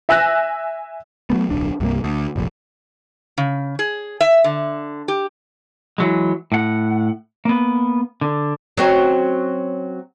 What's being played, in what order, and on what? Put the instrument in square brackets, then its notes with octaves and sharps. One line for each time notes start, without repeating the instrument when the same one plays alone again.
[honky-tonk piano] E5 G#5 E6 F#6 A#6
[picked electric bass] F#3 G3 A3 B3
D1 B1 D4
C2 G2 C3 A#3
D2
F1 A#1
[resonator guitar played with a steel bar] C#3
G#4
E5
D3
G4
[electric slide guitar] E3 F#3 G#3
A2 F#5
A#3 B3
D3
[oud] F#3 C4 C#4